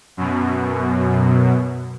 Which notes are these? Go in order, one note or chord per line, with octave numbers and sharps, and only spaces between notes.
F#2 B2